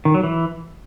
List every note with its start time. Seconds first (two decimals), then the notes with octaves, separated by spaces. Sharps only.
0.05 D#3
0.14 F#3
0.24 E3